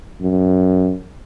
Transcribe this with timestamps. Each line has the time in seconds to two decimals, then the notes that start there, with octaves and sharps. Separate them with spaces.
0.21 F#2